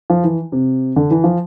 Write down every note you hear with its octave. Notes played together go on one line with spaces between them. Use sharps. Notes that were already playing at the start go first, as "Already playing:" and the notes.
F3
E3
C3
D3
E3
F3